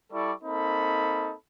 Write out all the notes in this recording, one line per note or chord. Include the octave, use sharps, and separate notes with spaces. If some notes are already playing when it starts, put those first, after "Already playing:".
G3 E4 A4 D5 C#6
A#3 C4 D#4 A4 B5